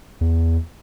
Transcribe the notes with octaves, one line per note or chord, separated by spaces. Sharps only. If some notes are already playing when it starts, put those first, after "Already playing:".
E2